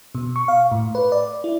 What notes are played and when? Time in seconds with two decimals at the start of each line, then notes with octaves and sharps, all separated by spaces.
0.15 B2
0.36 C#6
0.48 F5
0.72 A2
0.95 B4
1.12 D5
1.44 E4